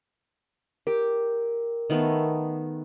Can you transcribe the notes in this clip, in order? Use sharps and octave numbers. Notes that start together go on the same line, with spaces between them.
G4 A#4
D#3 A3 B3